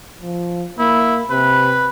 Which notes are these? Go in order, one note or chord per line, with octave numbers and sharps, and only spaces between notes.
F3
A#3 E4
C3 B4